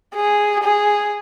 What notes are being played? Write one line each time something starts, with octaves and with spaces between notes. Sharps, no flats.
G#4
G#4